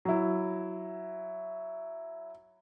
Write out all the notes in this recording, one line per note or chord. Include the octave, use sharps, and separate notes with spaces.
F#3 E4